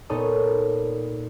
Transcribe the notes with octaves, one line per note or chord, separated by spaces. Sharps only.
A#2 B3 D#4 A4 C#5 D#6